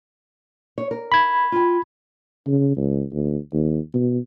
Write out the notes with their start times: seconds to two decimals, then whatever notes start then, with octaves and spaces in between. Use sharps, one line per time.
0.78 C#5
0.91 A#4
1.12 B5 G#6
1.52 F4 G5
2.47 C#3
2.77 C#2
3.12 D2
3.53 D#2
3.94 B2